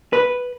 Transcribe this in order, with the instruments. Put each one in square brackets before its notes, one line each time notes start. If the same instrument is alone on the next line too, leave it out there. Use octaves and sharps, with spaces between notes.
[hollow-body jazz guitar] B4